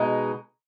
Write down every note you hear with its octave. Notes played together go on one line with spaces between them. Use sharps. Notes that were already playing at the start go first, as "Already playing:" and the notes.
Already playing: B2 G#3 D#4